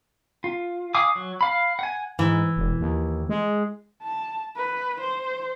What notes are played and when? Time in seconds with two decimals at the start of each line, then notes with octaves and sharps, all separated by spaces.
0.44 F4
0.95 F5 G#5 D6 D#6
1.15 F#3
1.41 F5 B5
1.79 F#5 G#5
2.19 G#2 E3
2.57 E1
2.80 D#2
3.29 G#3
4.03 A5
4.57 B4
5.01 C5